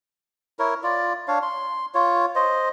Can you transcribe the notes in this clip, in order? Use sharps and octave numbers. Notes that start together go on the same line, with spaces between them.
E4 A#4 C#5
F4 D5
D4 C#5 F5
C6
F4 C#5
C5 D#5